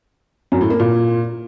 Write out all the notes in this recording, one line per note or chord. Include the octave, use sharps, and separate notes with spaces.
F#2
A2
A#3
A#2